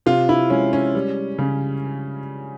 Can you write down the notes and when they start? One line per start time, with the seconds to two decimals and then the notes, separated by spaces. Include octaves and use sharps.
0.06 C3 F4
0.29 E4
0.50 G#3 C#4
0.73 C#4
0.95 G3
1.39 C#3